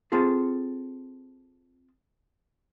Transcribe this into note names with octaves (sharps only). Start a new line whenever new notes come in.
C4 F4 G#4 A4